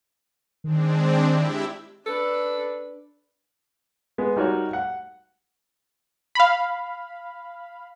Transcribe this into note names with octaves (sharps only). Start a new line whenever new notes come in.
D#3 G#3 C4 D4
E4 G4 E5
D4 A4 B4
G#3 B3
G3 D#4 F#4 A#4 C#5
F#5
F5 B5